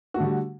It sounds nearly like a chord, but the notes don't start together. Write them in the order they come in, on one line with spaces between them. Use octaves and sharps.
F#4 A3 D3 G3